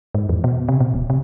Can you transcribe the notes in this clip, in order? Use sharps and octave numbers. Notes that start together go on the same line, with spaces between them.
G#2
E2
B2
C3
B2
D1
C3